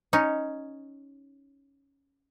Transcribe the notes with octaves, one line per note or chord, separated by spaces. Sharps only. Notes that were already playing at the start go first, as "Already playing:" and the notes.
C#4 D#4